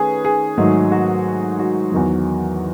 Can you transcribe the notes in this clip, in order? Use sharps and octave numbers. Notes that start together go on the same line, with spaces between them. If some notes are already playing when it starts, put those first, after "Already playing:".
Already playing: D#3 A3 C#4 G#4 B4
G#4
G#2 D#3 F#3 A3 D#4
F#4
F#4
E2 D#3 F#3